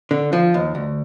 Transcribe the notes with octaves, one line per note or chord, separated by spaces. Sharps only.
D3
F3
D#2
D2